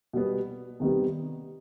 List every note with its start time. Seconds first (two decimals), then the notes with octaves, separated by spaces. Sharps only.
0.13 B2 G3 B3
0.80 C3 D#3 G3 B3